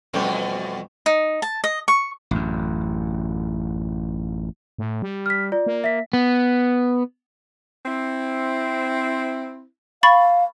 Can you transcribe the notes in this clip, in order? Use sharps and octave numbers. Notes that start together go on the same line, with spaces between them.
F2 B2 E3 G3 A3 C#4
D#4
A5
D#5
C#6
A1 F#2
A2
G3
F6 B6
F4 D5
A#3
E5 B6
B3
C4 E4
F5 B5 C#6 A6